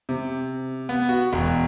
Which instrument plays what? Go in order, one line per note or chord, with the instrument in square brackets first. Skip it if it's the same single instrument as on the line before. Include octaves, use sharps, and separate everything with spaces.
[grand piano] C3
B3
F#4
E1